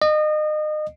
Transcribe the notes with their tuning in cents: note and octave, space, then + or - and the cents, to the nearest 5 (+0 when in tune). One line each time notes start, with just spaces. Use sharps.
D#5 -30